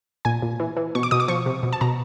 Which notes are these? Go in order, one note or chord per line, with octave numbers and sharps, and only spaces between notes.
A#2 G#5
A#2
E3
E3
B2 C#6
D6
B2 D#6
D6
F3 C#6
C3
B2
A5
B2 A#5